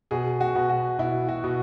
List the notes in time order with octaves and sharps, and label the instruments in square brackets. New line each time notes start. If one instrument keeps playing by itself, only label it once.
[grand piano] B2 G#4
F#4
B2
F#4
B2 E4
F#4
B2